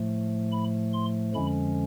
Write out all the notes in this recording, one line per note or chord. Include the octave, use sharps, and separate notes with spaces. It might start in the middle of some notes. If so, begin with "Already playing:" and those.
Already playing: A2 F3 A3
B5
C6
F2 D3 F3 G#3 C#4 B5